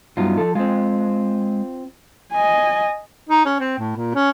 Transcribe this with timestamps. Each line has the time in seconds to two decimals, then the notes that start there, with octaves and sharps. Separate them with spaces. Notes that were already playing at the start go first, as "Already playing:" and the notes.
0.17 G2 F#3 B3 D#4 F4
0.37 F3 A4
0.55 G#3 C4 F4
2.33 D#5 G#5
3.29 D#4
3.45 C#4
3.60 C4
3.79 A2
3.96 A#2
4.15 C#4